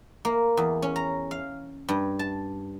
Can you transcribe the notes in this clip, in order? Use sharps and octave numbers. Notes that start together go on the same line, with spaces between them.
A#3
E2
C#4
A#5
F5
G2
A5